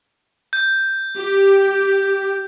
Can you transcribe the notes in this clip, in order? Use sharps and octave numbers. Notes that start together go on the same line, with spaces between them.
G6
G4